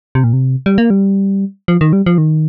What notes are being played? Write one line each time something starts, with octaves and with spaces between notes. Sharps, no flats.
C3
A#2
C3
G3
A#3
G3
F3
D#3
G3
F3
D#3